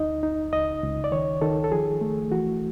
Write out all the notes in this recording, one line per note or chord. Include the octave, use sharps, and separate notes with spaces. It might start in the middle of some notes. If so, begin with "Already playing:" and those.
Already playing: D2 D#4 D#5
D#4
C#2 D#5
C#2
D5
D#3 C#5
D#3 A4
A4
F3 G#4
A3
E3 F#4